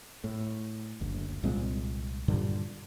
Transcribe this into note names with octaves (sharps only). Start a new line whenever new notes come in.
A2
F#1 D2
C2 A#2 G#3 C4
G2 A#2 D3 G3